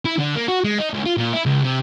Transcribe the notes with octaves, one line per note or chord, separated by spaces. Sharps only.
E4
D3
A#3
F#4
G#3
D#4
C#2
F4
A#2
E4
C#2
C3